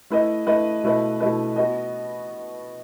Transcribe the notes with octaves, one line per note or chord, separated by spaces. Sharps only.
A3 E4 B4 D#5
A3 E4 B4 D#5
B2 A3 E4 B4 D#5
B2 A3 E4 B4 D#5
B3 F#4 B4 D#5